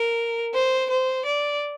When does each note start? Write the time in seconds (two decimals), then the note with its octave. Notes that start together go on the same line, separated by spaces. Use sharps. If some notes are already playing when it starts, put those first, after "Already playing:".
Already playing: A#4
0.55 C5
0.91 C5
1.26 D5